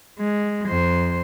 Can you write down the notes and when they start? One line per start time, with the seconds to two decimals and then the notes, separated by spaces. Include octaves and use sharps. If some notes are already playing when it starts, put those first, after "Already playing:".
0.20 G#3
0.68 F2 C5